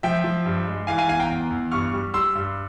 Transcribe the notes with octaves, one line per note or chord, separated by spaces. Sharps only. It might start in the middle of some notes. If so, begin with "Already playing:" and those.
F3 E5 G5
F3
G2
G#3
E3 F5 G#5
F5 G#5
E2 F5 G#5
G5 A#5
E2
E2
G2 C#6 F6
G3
G3 C6 E6
G2